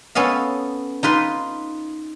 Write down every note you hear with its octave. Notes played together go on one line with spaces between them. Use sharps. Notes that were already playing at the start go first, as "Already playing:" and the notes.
B3 C#4 A4 D#5 F5
D#4 F4 B4 C6